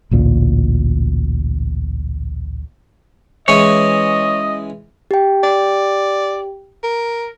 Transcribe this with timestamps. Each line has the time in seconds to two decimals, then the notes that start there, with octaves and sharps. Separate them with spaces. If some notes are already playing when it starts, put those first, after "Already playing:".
0.11 A1 D2 A#2
3.48 E3 G#3 C#4 C#5 D#5
5.11 G4 G5
5.43 D5
6.83 A#4